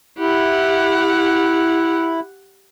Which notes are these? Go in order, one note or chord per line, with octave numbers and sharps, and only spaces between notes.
E4 G4 F#5